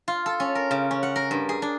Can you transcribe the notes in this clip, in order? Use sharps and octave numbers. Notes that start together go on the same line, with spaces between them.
F4
A4
C#4
A#4
C#3
C#4
F#5
A#4
G2
G#4
D4